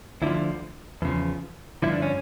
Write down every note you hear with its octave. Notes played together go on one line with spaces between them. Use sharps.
D2 D3 F3 E4
E2 C#3 F3
G2 D3 F3 E4
D4
C#4